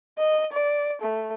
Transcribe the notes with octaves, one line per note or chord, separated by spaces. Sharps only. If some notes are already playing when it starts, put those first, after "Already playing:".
D#5
D5
A3